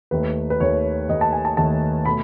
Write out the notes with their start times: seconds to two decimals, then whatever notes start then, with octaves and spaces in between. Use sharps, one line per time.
0.11 D#2 D#3 A3 B4
0.50 B4
0.60 D#2 D#3 A3 C#5
1.09 D#2 D#3 A3 D#5
1.21 A5
1.33 G#5
1.45 A5
1.57 D#2 D#3 A3 A5
2.05 B2 A3 B5